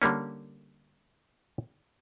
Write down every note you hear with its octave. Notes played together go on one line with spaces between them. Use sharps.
D3 G3 A#3 C#4